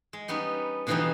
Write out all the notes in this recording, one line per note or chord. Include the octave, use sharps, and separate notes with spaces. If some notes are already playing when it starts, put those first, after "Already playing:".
G#3
G3 B3 C#4 D#4
B2 D3 E3 F3 G3 D#4